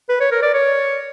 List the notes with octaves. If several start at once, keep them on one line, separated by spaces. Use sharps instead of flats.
B4
C#5
A#4
D5
C#5